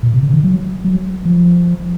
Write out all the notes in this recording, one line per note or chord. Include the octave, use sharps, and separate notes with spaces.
A#2
C3
C#3
D#3
F#3
F#3
F3